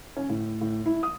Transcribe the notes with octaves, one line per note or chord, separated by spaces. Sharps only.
C#4
A2
A2
E4
D#6